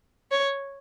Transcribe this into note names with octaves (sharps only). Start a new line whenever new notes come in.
C#5